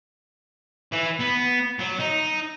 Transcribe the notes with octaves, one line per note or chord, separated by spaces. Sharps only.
E3
B3
F#3
D#4